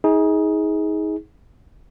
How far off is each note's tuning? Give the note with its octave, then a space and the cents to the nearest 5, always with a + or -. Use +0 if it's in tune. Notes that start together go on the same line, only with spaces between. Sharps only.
D#4 +35 G#4 +0